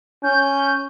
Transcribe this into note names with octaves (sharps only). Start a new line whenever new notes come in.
C#4 G6